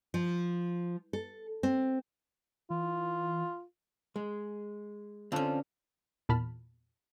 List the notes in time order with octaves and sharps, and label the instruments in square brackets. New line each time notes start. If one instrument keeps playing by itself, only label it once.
[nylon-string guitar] F3
A4
C4
[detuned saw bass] E3 [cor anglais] F4
[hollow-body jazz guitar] G#3
[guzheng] D3 C#4 [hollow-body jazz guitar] C4 F4 A4
[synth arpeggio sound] E2 A#2 A5 B5 F6